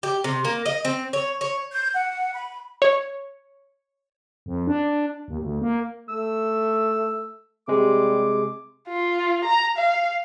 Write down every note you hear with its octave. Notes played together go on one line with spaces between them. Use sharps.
G4
C3
A#3
D#5
C4
C#5
C#5
G6
F#5
B5
C#5
F2
D4
D#2
D2
A#3
A3 E6
C3 G3 G#3 D6
F4
A#5
F5